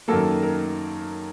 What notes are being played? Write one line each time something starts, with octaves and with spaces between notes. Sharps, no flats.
F#2 D#3 F#3 A#3 A4
A#4